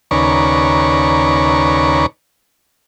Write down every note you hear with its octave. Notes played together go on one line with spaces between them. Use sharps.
D#2 C#3 B4 D5 A#5 C#6